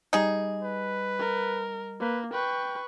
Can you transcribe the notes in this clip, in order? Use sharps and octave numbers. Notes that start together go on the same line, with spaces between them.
G3 D#4 G#4 D#5
B4
A#4
A#3 B4
B4 G5 C#6